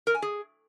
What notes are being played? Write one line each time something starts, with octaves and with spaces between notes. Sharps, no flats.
A#4
G#5
G#4